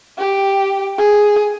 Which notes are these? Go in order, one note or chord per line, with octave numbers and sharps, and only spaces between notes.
G4
G#4